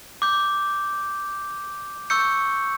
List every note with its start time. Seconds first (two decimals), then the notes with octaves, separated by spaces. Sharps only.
0.22 D6 G6
2.10 C#6 E6 G6 C#7